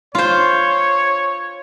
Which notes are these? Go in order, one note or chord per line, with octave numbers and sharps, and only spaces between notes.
F4 C5 C#5